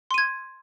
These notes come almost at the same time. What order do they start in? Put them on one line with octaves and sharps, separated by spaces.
C6 D#7 G#6